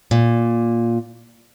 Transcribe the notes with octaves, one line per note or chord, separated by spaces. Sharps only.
A#2